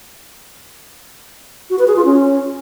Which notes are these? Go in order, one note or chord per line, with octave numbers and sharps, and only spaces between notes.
F#4
B4
G#4
F4
C#4